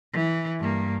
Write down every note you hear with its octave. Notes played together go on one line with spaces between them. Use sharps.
E3
G2 A#3